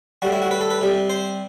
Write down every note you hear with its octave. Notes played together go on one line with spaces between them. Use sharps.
A2 G3 F#4
E4
F#4
B4
A4
B4
C3 G3
C5